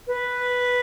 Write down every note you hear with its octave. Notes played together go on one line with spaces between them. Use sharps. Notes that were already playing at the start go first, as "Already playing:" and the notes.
B4